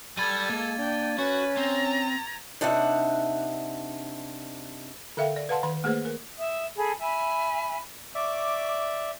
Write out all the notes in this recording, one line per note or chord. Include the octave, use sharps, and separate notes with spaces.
G3 A4 B5 G#6 A6 D#7
G#3 A#3 G#6
D4 G5
C#4 F#4 B4
C4 A#5
C3 D4 D#4 E5 F#5
D3 A4 E5 F5 G5
D5
B4 F5 F#5 A5 C6
D#3 C6
A3 A#3 G#4 B4 C5
A#4
E5 D#6 E6
G#4 A4 B5
E5 G#5 B5
D5 E5 C#6 D6